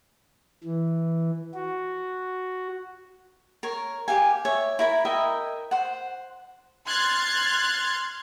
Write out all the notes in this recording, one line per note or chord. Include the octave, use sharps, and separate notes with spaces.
E3
F#4
A#4 C#5
G4 F5 G#5
C#5 E5
E4 A#4 B5
A#4 D#5 E5 G5
C5 F#5
C6 F6 F#6 G#6 A6